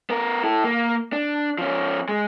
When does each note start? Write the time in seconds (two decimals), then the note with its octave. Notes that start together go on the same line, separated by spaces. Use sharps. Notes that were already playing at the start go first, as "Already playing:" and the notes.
0.10 B3 A#4
0.44 E4 A4
0.64 A#3
1.13 D4
1.58 F3 C#4
2.09 G#3